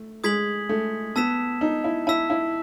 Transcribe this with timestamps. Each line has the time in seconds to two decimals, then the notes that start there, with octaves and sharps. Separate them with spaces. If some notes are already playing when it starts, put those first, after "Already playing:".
Already playing: A3
0.24 G#3 D#6 G#6 B6 F#7
0.69 A3
1.16 B3 A5 E6 B6 E7
1.61 D#4
1.84 E4
2.07 E4 A5 E6 B6 E7
2.30 E4